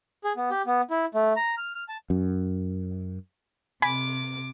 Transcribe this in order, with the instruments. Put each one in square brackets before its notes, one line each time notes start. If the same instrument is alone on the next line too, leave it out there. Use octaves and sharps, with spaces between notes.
[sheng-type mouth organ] G#4
B3
G4
B3
E4
A3
A#5
F6
F6
A5
[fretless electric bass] F#2
[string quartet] C3 D6 [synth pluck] G#5 B5